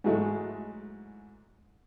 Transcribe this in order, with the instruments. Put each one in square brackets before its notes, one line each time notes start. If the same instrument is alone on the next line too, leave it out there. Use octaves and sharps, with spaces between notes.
[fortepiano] G#2 E3 F#3 G#3 A3